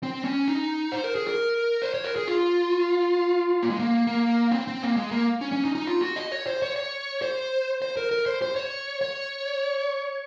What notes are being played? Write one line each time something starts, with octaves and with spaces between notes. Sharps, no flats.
C4
C#4
D#4
C5
A#4
G#4
A#4
C5
C#5
A#4
G#4
F4
A#3
G#3
A#3
A#3
C4
C4
A#3
G#3
A#3
C#4
C#4
D#4
D#4
F4
F#4
D#5
C#5
C5
C#5
C#5
C5
C5
A#4
A#4
C5
C5
C#5
C#5